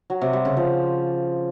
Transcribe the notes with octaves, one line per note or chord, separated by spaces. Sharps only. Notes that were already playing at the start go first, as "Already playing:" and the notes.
F#3
C3
G3
C#3
F3